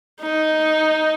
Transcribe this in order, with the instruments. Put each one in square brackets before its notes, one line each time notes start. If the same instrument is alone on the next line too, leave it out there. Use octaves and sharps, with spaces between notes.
[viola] D#4